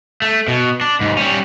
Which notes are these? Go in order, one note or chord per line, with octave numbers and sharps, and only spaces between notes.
A3
B2
D4
D#2 G#2
G3 C#4